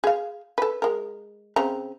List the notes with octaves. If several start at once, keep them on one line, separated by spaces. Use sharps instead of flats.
G#4 F5
A4 B4
G#3 A#4
C#3 C4 A#5